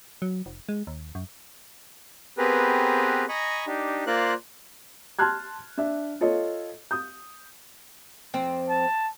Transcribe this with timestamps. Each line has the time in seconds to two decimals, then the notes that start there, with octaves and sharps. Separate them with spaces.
0.22 F#3
0.46 F1
0.69 G#3
0.87 D#2
1.15 F#2
2.37 B3 C4 G4 G#4 A#4 B4
3.29 D#5 G#5 A#5 B5 C#6
3.67 D4 D#4 G4
4.07 A#3 F4 A#4 C5 D5 F#6
5.19 A5 C6 F6 F#6 G#6
5.77 D4 E5
6.21 F4 A4 C#5 D#5
6.91 D#6 G6
8.34 F2 C4
8.70 A5